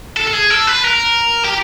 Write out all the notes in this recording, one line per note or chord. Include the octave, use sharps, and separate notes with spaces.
A4
A4
G#4
A4
B4
A#4
G4